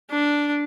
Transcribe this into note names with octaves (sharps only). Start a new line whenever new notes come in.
D4